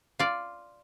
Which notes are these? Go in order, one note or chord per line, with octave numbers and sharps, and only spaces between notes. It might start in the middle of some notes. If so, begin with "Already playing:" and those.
F4 D5